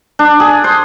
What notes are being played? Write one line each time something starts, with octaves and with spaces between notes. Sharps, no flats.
D4
G#4
C5